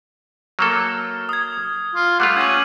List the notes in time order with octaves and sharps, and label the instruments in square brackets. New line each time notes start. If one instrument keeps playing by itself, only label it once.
[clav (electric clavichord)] F#3 A#3 A4 [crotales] F6
[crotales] D#6 G#6
[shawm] F4
[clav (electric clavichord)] G3 A3 F4 [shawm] F#5
[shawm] C#4 [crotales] G#6 D#7 F#7